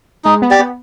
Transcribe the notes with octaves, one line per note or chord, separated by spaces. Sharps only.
G#3 D#4
B3
G4 D5
B3